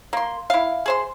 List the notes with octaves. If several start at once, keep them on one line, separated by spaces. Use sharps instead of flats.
A#3 C6
E4 F5
G#4 C5 C6